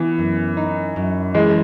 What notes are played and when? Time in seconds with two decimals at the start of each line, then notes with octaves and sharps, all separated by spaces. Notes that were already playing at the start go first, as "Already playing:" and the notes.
Already playing: E3 B3
0.18 F#2
0.57 D#4
0.96 F#2
1.35 E3 G#3